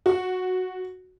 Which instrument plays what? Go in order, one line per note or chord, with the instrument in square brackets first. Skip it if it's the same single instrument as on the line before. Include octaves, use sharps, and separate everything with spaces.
[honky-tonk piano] F#4